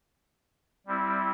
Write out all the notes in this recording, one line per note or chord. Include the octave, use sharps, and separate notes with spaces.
G3 C4 E4